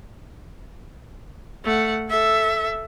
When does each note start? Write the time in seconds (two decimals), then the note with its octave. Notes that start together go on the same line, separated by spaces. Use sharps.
1.64 A3 F#5
2.09 A4 E5